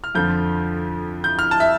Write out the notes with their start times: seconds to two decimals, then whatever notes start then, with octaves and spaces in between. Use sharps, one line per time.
0.04 F6
0.15 F2 D3 F3 G6
1.24 G6
1.39 F6
1.51 A5
1.60 E5